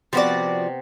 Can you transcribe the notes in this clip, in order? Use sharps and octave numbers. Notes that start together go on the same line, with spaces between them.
C3 F3 B3 C4 F#4 D5